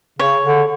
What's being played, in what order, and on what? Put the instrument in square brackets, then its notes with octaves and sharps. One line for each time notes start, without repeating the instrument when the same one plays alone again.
[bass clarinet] C#3 [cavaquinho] C#5
[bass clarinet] D3